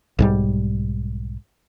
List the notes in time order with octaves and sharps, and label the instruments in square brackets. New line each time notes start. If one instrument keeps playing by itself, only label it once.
[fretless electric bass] B1 G#2 G3